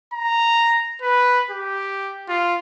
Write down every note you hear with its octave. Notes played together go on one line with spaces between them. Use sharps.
A#5
B4
G4
F4